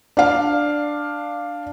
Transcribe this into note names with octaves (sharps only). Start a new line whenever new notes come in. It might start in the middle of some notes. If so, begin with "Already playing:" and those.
D4 F5